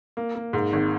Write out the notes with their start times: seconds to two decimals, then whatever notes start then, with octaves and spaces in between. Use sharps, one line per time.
0.17 A#3
0.35 A#3
0.53 G#2
0.73 G#1